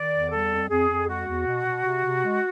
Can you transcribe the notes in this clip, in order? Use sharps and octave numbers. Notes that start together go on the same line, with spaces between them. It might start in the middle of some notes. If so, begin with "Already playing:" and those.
Already playing: D#3 D5
E2
G3 A4
F2
F2 G#4
F2
G#3 F#4
E2
B2
B2
C3
C3
G#3